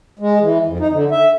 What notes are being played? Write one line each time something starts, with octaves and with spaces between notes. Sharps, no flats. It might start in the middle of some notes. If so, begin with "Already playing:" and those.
G#3
E3
F2
D#4
D3
E5